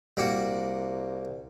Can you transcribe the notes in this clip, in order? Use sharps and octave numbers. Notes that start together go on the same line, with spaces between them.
C2 G3 A#3 F#4